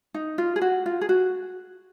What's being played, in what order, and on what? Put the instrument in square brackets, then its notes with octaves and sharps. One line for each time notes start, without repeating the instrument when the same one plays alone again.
[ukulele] D#4
F4
G#4
F#4
F4
G#4
F#4